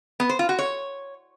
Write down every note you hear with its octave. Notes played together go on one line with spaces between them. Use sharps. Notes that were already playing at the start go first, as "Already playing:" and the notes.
B3
C5
F4
F#4
C#5